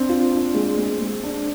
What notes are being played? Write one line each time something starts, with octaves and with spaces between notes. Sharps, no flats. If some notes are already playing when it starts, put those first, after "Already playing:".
Already playing: C4 D4
F4
D4
G#3
G#3
G#3
D4